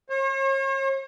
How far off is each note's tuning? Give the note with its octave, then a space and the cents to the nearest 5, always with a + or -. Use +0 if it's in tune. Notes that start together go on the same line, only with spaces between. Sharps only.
C#5 -45